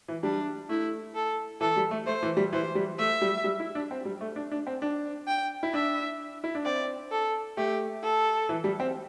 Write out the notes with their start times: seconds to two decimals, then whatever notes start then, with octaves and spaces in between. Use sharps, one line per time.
0.08 E3
0.23 G3 D4
0.69 A3 E4
1.15 A4
1.61 E3 A4
1.76 G3
1.91 A3
2.06 A3 C5
2.23 E3
2.37 G3
2.53 E3 C5
2.75 G3
2.99 A3 E5
3.22 G3
3.44 G3
3.60 E4
3.75 D4
3.91 C4
4.05 G3
4.21 A3
4.36 D4
4.52 D4
4.67 C4
4.82 D4
5.27 G5
5.63 E4
5.74 D4 E5
6.44 E4
6.55 D4
6.65 C4 D5
7.11 A4
7.57 A3 G4
8.03 A4
8.49 E3
8.64 G3
8.80 C4